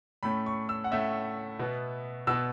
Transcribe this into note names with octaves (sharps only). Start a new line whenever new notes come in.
A2 A3 C#4 B5
C#6
E6
F#5
A2 A3 C#4 E5
B2 B3
B2 B3 E6